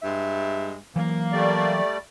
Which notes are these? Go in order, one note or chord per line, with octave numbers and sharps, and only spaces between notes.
G2 G#3 E5
E3 F#3 A#3
G3 A3 D5